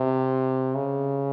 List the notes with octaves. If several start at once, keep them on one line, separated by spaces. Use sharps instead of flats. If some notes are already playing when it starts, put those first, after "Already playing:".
Already playing: C3
C#3